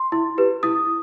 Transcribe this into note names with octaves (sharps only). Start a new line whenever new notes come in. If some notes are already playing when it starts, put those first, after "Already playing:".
Already playing: C6
E4
G4 B4
E4 D#6